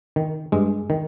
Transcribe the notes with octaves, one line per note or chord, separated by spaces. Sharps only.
D#3
G2 G#3
D#3